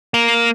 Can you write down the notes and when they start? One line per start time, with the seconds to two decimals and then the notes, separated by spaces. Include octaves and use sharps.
0.14 A#3